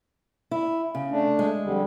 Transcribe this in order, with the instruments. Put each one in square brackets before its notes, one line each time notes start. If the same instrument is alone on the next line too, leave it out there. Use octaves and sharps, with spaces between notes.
[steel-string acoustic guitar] E4
C#3
[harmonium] A3 D4
[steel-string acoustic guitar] G#3
[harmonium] F2 D3 G3